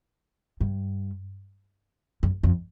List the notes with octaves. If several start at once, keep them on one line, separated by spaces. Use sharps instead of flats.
G2
F#2
F2